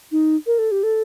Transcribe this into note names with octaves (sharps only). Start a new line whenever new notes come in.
D#4
A#4
A4
G4
A4